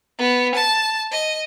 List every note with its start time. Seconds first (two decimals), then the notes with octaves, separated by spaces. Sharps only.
0.19 B3
0.55 A5
1.12 D#5